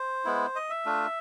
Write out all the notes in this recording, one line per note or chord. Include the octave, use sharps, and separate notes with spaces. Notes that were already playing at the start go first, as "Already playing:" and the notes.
Already playing: C5
G#3 B3 E4
D#5
E5
A3 D4 F4